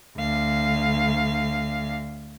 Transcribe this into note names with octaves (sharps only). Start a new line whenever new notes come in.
D2 F5